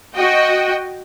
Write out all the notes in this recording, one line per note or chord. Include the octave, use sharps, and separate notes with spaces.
F#4 D#5 G5